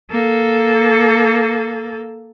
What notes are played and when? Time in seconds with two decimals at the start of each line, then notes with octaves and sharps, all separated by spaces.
0.11 A#3 A4